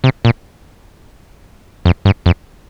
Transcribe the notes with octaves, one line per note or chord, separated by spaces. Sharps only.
C3
A#2
F2
G2
F2